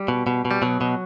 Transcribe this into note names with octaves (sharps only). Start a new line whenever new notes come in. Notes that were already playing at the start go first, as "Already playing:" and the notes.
Already playing: G3
B2
B2
B2
G3
B2 F#3
B2